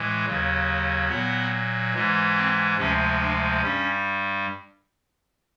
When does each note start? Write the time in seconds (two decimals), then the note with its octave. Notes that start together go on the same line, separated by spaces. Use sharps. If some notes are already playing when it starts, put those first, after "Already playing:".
Already playing: A2 E3 G#3
0.25 D#2 C#3 F#3
1.09 A#2 F#3 B3
1.94 G#2 E3 G#3
2.36 C4
2.78 D2 C3 F3 G#3 C#4
3.20 D4
3.62 G2 G3 C#4